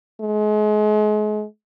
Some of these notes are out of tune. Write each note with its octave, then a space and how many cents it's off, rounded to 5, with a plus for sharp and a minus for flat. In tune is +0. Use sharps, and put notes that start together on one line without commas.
G#3 +35